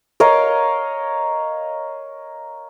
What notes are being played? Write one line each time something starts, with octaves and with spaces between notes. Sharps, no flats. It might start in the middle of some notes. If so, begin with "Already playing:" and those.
A#4 C#5 D#5 F5